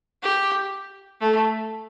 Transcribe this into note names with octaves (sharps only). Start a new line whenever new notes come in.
G4
A3